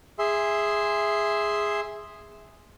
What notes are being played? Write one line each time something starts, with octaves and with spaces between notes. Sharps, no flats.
G#4 E5 C6